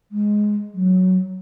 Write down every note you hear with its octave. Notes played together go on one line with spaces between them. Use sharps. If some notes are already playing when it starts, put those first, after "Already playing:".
G#3
F#3